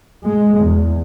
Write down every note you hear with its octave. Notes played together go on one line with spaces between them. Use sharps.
G#3
E2